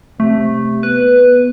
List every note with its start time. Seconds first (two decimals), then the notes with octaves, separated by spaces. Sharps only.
0.20 C3 A3
0.83 B3 B4